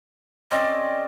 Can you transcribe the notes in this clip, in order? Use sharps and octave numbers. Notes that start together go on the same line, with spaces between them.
C#3 C4 D5 D#5